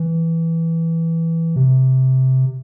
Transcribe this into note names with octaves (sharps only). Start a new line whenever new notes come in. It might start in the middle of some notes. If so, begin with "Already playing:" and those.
Already playing: E3
C3